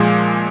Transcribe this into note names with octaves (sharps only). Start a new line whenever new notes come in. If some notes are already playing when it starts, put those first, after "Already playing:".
Already playing: A#2 F3 G#3